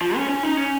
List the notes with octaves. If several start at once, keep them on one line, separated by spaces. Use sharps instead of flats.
F3
C#4
C#4
D#4
C#4